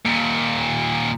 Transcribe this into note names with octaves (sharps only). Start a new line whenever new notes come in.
D#2 A#2